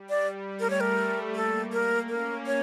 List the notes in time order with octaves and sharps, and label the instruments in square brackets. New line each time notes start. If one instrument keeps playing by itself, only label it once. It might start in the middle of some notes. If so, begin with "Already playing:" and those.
Already playing: [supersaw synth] G3
[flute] D5
[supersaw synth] G3
[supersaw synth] A3 [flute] A#4
[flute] C#5
A#4
[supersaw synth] A#3 [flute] A4
[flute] A#4
[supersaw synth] C#4 [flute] A#4
[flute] C#5